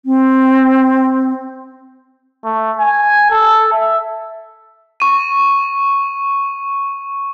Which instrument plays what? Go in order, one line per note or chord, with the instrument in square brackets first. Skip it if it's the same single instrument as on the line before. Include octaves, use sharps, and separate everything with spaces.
[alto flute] C4
[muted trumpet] A3
G#5
A4
E5
[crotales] C#6 D#7